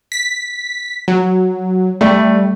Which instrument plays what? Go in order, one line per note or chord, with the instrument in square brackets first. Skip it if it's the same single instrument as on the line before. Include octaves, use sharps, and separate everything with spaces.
[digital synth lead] B6
F#3
[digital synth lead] G3 [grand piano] A3